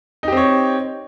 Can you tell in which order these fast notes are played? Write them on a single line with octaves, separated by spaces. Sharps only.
D#4 G4 C4 C#5